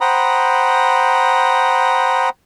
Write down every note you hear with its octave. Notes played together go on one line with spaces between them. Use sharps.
C5 F#5 G5 A#5 B5 D#6